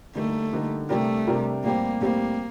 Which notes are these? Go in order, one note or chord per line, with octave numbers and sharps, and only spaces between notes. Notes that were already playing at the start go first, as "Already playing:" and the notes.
D3 G3 A3 A#3 D#4
D3 G3 A#3 D#4
C3 G3 A3 D4 G4 A#4
C3 G3 D4 G4 A#4
A2 G3 A#3 C4 G4
A2 G3 A#3 C4 G4